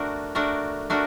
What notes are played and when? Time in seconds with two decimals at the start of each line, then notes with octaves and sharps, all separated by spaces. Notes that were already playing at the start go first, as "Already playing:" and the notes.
Already playing: A3 D4 F#4 A#4
0.35 A3 D4 F#4 A#4
0.90 A3 D4 F#4 A#4